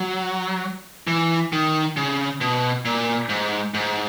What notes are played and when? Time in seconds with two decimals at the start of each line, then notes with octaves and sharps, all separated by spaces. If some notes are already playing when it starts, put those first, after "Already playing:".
Already playing: F#3
1.07 E3
1.53 D#3
1.97 C#3
2.41 B2
2.85 A#2
3.29 G#2
3.74 G#2